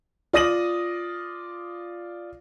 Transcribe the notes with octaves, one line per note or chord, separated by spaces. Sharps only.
F4 D5 D#6 A#6 D#7 F#7